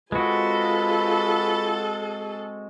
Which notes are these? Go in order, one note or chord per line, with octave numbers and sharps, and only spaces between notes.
G#3 C4 F4 F#4 G#4 A4 B4